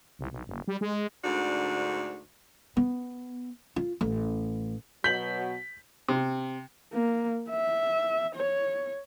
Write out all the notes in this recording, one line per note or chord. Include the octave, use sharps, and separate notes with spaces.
C2
B1
F#1
G3
G#3
D2 G#2 D3 D4 F#4
B3
F4
A1
B2 F#3 G6 B6 F#7
C3
A#3
E5
C#5